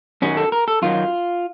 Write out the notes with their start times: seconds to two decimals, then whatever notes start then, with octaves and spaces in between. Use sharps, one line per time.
0.22 F#2 D#3 F#3 C#4
0.37 A4
0.52 A#4
0.68 A4
0.82 F#2 D#3 F#3 F4